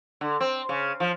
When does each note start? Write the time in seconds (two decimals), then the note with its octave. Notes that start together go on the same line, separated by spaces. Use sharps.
0.21 D3
0.40 C4
0.69 C#3
1.00 F3